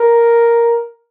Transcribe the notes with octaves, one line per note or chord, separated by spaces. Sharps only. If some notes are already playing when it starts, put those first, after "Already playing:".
Already playing: A#4